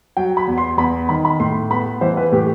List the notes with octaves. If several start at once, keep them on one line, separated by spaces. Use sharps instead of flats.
F#3 G5
B5
E2
C6
E2 B5
D#3 B5
B5
A2 C6
B3 B5
E3 C5
B4
A2 G4